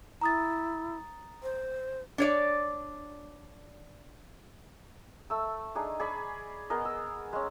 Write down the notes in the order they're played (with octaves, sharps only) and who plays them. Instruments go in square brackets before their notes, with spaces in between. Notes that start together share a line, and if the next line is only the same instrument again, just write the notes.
[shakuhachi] E4 [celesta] A#5 D#6 A6
[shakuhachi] C5
[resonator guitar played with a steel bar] D4 C#5 D5
[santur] A3 E6
D4 D#4 G#4
G#4 D5 B5 C#6
B3 G#4 A#4 D#5
E6
G#3 C#4